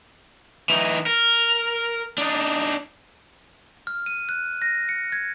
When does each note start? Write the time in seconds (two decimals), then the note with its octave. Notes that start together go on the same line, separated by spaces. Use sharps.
0.70 E3 D#4
1.06 A#4
2.18 D4 D#4
3.87 F6
4.06 D#7
4.29 F#6
4.62 A#6
4.89 C#7
5.12 G#6